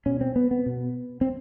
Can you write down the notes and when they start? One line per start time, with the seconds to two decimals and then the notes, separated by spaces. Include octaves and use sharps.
0.06 B2 C#4
0.21 C4
0.36 B3
0.51 B3
0.66 B2
1.21 C4